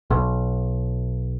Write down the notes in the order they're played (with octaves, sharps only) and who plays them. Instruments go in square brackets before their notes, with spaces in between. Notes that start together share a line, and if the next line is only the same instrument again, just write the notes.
[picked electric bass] B1